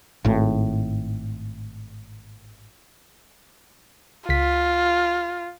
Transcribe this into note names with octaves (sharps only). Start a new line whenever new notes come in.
G#1 A2
C#2 F4 B6